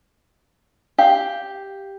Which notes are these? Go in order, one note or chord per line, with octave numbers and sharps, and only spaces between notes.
G4 F5